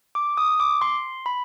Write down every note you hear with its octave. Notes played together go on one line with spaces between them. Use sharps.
D6
D#6
D6
C6
B5